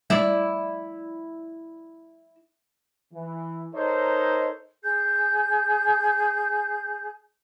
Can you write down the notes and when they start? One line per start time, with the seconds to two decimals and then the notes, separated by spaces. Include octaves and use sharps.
0.10 E4 D5
3.13 E3
3.75 D#4 A4 A#4 C5 C#5 D#5
4.82 G#4 G6